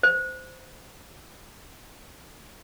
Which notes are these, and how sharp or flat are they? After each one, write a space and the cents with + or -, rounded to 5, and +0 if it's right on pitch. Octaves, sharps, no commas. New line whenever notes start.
C5 -15